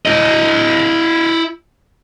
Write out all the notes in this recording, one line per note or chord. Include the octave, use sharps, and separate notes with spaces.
E4 D#5